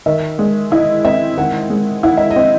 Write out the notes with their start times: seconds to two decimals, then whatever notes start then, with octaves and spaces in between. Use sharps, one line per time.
0.06 D#3 E5
0.39 G#3
0.71 E4 D#5
1.04 C4 E5
1.37 D#3 F#5
1.70 G#3
2.03 E4 F#5
2.17 E5
2.30 D#5
2.36 C4